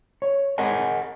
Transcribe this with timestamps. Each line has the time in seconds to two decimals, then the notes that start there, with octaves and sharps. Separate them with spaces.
0.22 C#5
0.58 G#4 A#4 D#5 F#5 G#5